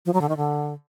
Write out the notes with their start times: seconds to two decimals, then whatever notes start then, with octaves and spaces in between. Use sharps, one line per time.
0.06 F3
0.14 F#3
0.21 D3
0.29 D#3
0.37 D3